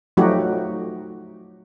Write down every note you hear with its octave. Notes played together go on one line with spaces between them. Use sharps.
F3 F#3 A3 D#4 F#4 G4